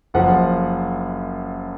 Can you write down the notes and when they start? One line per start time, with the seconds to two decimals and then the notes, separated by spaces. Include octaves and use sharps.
0.14 F#1 F#2 F3 F#5